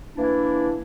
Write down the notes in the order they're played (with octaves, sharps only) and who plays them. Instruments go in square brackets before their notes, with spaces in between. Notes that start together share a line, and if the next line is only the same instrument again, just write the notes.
[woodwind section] E3 A#3 D4 E4